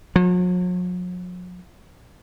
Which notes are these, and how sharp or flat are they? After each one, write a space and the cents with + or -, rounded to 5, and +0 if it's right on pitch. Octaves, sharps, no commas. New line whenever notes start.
F#3 -45